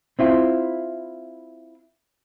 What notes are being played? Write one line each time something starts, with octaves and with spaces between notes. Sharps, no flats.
C4 E4 F4